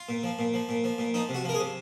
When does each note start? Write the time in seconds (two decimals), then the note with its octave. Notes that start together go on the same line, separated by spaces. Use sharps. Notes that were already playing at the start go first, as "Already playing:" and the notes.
Already playing: F4
0.09 A#2
0.23 F3
0.39 A#2
0.54 F3
0.69 A#2
0.84 F3
0.98 A#2
1.14 F3 D#4
1.29 C3
1.35 F#4
1.44 F3 A#4
1.54 G#4
1.59 C3